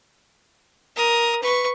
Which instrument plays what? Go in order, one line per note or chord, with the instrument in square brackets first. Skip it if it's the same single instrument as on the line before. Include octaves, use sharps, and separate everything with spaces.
[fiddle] A#4 D#6
B4 C#6